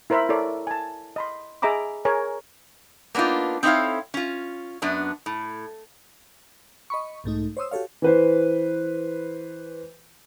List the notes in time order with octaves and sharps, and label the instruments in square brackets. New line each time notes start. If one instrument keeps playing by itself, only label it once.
[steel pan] E4 A#4 C5 E5 B5 C6
E4 A4 A#4 C#5 D5
G#5 A5
D#5 B5 C6
G#4 D#5 E5 A#5 B5 D6
G#4 A#4 C#5 G#5
[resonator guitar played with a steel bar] A#3 B3 D4 D#4 F4
C4 D#4 E4 A4 C#5 F5
C#4 F4
F#2 B3 D4
A2
[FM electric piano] D#5 B5 C#6
B1 G#2 A3 D#4
C5 C#5 C6 D#6 E6
F#4 G4 A4 C#5 F5
[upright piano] E3 B4 C5